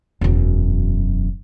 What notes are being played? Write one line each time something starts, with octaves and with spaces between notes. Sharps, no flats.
E1 F#2